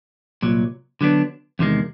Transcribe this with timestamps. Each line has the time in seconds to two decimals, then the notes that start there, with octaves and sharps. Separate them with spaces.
0.42 C2 A#2 F#3
1.01 D3 F#3 B3 D4
1.59 E2 C3 D#3 G#3